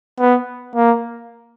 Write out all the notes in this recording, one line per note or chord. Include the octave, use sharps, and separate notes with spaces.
B3
A#3